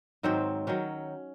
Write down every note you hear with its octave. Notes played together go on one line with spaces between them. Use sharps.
G#2 D#3 F#3 C4
D#3 F#3 C#4